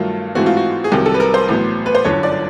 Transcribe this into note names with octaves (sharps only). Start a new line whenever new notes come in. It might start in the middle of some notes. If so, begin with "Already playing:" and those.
Already playing: G2 D#3 F#3 A3 F4
G#2 E3 A3 C4 F#4
F4
F#4
G#4
C2 C3 D#3 F#3 G4
A4
B4
A#4
C5
A1 A2 F#3 B3
B4
C5
G1 F#2 D3 C#5
D5